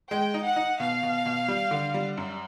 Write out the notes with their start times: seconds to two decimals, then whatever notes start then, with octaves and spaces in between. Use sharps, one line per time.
0.11 G#3 G5
0.34 D#4
0.45 F#5
0.56 D#4
0.79 B2 F5
1.03 B2
1.26 B2
1.48 G3
1.71 D3
1.94 G3
2.17 F#2